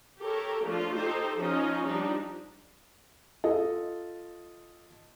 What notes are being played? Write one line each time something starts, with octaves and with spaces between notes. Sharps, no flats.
G4 A4 A#4 C#5
F3 A3 D4 F4
D#4 G4 A4 C5
F3 C#4 D#4 D#5
F3 G3 D4 D#4
F4 A4 D#5